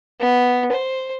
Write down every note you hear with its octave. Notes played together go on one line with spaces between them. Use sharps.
B3
C5